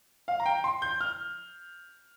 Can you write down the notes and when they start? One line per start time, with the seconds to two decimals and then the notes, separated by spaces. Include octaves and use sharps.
0.28 F5
0.40 A#5
0.46 G5
0.64 C6
0.82 G6
1.01 F6